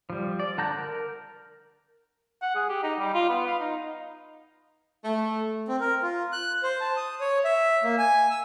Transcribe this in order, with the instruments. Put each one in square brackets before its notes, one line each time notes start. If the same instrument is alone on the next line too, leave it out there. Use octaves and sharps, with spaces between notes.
[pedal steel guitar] F3 G3
D5
D3 F#5 A5 A#5 G6
A#4
[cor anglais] F#5
G#4
G4
D#4
G3
F4
B3
F5
D#4
[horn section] A3
[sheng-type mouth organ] C4
A#4
F4
F#6
C5
A5
D#6
C#5
E5
A#3
G#5
E6